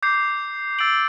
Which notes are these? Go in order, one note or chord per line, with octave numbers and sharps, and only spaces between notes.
D6 G6 C7
E6 A6 D7 F#7